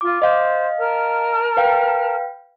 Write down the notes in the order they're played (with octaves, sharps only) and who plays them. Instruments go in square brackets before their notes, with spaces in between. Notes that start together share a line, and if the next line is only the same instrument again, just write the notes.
[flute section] F4 [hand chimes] D6
[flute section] C5 [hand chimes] D#5 F5
[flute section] A#4 A5 F6
[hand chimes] B4 F5 G5